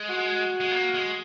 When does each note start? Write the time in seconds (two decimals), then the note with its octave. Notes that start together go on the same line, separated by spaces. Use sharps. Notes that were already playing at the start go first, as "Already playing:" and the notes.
Already playing: G#3
0.09 F#4
0.60 G#3
0.71 A#3
0.94 G#3